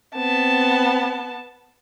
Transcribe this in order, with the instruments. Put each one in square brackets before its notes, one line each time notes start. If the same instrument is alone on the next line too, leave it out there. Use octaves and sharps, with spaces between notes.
[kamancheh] B3 A5 [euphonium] C4